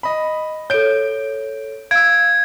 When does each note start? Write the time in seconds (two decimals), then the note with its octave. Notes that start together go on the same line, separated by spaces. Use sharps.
0.03 D#5 B5
0.70 A4 C#5 G6 D7
1.91 F5 E6 G#6 D7